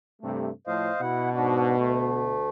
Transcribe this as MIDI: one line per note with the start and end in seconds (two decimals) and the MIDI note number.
0.22 0.50 43
0.22 0.50 48
0.22 0.50 57
0.67 0.90 45
0.67 0.90 53
0.67 1.01 72
0.67 1.01 75
0.67 1.01 77
1.01 2.35 47
1.01 1.29 64
1.01 1.29 78
1.32 1.76 44
1.32 1.76 62
1.32 1.76 66
1.76 2.50 38
1.76 2.50 57